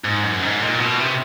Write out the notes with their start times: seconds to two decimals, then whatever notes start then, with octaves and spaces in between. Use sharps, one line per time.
0.05 G#2
0.24 F#2
0.42 G#2
0.61 A#2
0.80 B2
0.99 C3